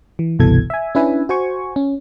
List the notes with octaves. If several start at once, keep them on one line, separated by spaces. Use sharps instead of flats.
E3
G1 C2 B2 E3 A4 G#6
E5 G#5
C#4 D4 E4 B4 E5 G#5
F#4 C5 G#5 C#6
C#4